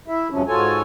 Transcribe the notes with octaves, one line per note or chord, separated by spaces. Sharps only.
E4 E5
E2 G2 C3 F3 F#3 C#4
G#2 F4 F#4 A4 C#5 G#5